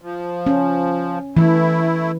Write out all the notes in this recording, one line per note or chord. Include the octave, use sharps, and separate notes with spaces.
F3
C#4
E3 A3 E4